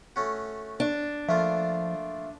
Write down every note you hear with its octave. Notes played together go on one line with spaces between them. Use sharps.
A3 C#4 F#4
D4
F3 A3 A#3 F4 E5